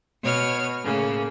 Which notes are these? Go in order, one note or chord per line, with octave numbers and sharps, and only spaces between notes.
B2 C#5 F6
A2 C#3 A#3